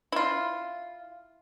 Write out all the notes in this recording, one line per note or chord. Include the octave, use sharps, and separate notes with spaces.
E4 F4